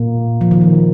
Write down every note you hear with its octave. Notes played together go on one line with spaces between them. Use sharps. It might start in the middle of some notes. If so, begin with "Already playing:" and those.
Already playing: A#2 A#3
F3
D#3
F3